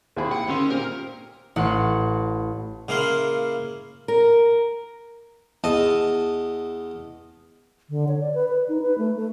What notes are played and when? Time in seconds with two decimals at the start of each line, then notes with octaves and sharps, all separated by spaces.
0.16 D#2 C4 E4 G#4 B5
0.31 F#5 G5
0.49 D#3 C#4 C6 E6
0.70 A#2 C4 G4 A#4
1.56 A1 F#5 C6 C#7
2.88 C#3 A#3 E4 F5 C6
4.08 A#4
5.64 E2 D#5 A5
7.90 D3
8.08 C#5
8.21 D5
8.34 B4
8.49 B4
8.69 D#4
8.82 B4
8.98 A3
9.17 A3